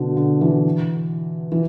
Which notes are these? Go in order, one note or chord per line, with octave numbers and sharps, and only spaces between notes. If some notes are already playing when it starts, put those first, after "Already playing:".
Already playing: B2 D3
D3
E3
E3